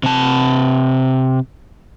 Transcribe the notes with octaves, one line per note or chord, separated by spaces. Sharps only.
C3 A5